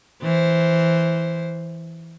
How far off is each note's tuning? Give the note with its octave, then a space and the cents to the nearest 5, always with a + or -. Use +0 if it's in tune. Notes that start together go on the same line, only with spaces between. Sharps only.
E3 +0 C5 +0